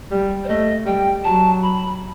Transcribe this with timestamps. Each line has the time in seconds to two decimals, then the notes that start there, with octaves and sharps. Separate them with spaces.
0.11 G3
0.44 C5
0.48 A3 D#5
0.86 G3 G5
1.24 F#3 A5
1.62 B5